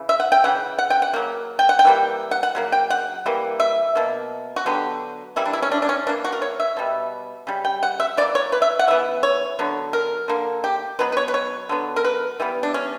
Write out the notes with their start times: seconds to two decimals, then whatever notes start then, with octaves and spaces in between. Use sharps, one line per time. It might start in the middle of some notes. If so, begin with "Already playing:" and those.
Already playing: C#3 E3
0.09 E5
0.20 F#5
0.32 G5
0.44 C#3 E3 F#5
0.79 F#5
0.90 G5
1.02 F#5
1.14 C#3 F#3 A#3
1.59 G5
1.69 F#5
1.79 G5
1.85 E3 G3 A#3
2.31 F#5
2.43 F#5
2.55 C#3 F#3 A#3
2.72 G5
2.90 F#5
3.26 E3 G3 A#3
3.60 E5
3.95 B2 F#3 A#3
4.56 F#4
4.66 D3 F#3 B3 G4
5.36 E3 G3 A#3 E4
5.45 D4
5.53 E4
5.62 C#4
5.72 D4
5.82 D4
5.89 C#4
6.07 E3 A#3 D4
6.24 F#4
6.32 A#4
6.42 C#5
6.60 E5
6.77 B2 G3 B3
7.47 C#3 G3
7.65 G5
7.83 F#5
8.00 E5
8.17 E3 D5
8.21 A#3
8.35 C#5
8.52 B4
8.62 E5
8.79 F#5
8.87 C#3 E3 B3 E5
9.23 C#5
9.59 D3 F#3 B3
9.93 A#4
10.28 D3 A#3
10.64 G4
10.99 B2 F#3 B3 B4
11.12 B4
11.17 C#5
11.28 B4
11.34 C#5
11.69 D3 F#3 B3
11.96 A#4
12.05 B4
12.40 E3 G3 B3
12.63 D4
12.74 C#4